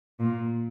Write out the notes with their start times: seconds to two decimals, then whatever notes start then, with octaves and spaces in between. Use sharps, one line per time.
0.20 A#2